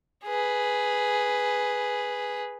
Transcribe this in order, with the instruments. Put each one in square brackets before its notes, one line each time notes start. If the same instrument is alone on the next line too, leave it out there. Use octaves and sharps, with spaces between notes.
[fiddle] G#4 B4